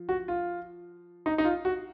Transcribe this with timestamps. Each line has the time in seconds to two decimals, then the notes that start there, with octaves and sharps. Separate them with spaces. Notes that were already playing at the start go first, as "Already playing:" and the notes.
Already playing: F3
0.09 F#4
0.28 F4
1.26 D#4
1.38 D#4
1.45 F4
1.65 F#4